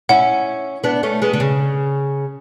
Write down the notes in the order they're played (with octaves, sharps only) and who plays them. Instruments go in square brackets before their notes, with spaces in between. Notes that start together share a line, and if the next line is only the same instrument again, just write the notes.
[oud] C#4 E4 [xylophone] F#5
[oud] B3 D4
A3 C#4
G#3 B3
D3
C#3